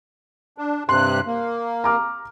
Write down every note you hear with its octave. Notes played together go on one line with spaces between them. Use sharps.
D4
G2 C3 C6 F#6
A#3
A#5 D6 F6